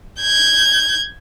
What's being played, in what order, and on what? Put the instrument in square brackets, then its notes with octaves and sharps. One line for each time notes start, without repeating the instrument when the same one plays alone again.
[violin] G6 G#6